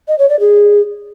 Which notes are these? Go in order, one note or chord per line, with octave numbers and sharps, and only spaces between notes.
D#5
C#5
D5
G#4